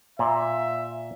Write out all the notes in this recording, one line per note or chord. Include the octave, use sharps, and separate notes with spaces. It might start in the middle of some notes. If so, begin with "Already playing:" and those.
A#2 E5